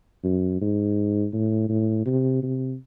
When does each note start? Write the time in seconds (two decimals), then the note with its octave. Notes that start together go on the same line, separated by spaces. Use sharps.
0.24 F#2
0.61 G#2
1.33 A2
1.69 A2
2.06 C3
2.42 C3